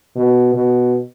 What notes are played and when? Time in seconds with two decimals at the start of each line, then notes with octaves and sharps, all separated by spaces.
0.16 B2
0.55 B2